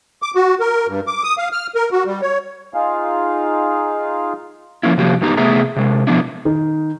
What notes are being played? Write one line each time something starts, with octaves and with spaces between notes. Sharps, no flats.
D6
F#4
A#4
G2
D6
D#6
F5
F6
A#4
F#4
G3
C#5
D#4 F4 G#4 F5
F3 A#3 C#4 E4
C3 F3 A#3 F#4 G4
G2 B3 D#4 G4 A#5
C3 A3 B3 G#4 E5 A#5
C3 G#3
B2 F3 B3 D4 E4
D#3